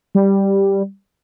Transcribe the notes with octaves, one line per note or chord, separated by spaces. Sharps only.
G3